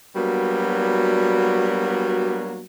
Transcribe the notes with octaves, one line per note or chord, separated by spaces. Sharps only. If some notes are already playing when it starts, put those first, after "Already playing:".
F#3 G3 A#3 B3 D4 F#4